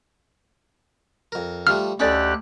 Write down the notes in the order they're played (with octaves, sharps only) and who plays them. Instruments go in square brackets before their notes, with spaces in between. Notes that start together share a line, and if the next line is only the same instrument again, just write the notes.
[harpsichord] F2 A#4
[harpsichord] F3 G3 A3 [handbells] F6
[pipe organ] D2 G4 F#6 [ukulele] C#4 A4 D5 [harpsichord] D#4 B5